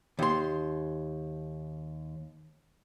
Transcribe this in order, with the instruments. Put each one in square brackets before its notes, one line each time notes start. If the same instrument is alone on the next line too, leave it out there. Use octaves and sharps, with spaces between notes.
[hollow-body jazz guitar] D#2 C6